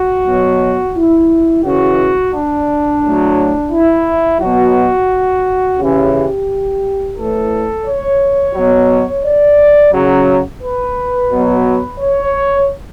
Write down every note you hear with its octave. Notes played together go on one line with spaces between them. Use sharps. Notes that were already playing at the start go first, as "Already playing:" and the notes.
Already playing: F#4
B2 F#3
E4
C#3 E3 F#4
D4
A2 F#3
E4
B2 F#3 F#4
C#3 E3 G4
G4
A2 E3 A4
C#5
B2 F#3
D5
C#3 F#3
B4
B2 F#3
C#5